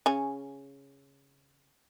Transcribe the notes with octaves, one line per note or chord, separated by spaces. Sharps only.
C#3 C#4 G#5